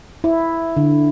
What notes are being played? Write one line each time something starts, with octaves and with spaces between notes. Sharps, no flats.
E4
D3